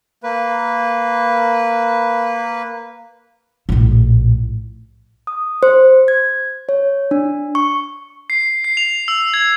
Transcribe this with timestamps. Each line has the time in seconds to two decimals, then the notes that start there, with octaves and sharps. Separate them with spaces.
0.23 A#3 B4
3.69 A#1 A2
5.27 D#6
5.63 C5
6.08 G#6
6.69 C#5
7.11 D4
7.55 C#6
8.30 C7
8.64 C7
8.77 F7
9.08 E6
9.34 G#6